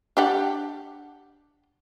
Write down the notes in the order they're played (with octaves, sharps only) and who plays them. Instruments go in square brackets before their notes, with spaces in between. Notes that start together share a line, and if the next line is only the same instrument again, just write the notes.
[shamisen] D4 G4 F#5